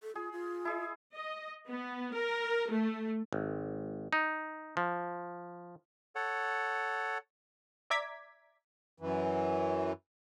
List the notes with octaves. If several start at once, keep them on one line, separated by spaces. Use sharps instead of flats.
A4
F4 G#4
F4
E4 G#4 D#5
D#5
B3
A#4
A3
G#1
D#4
F3
A4 C#5 F#5
D5 E5 A#5 D6 G#6 B6
F#2 E3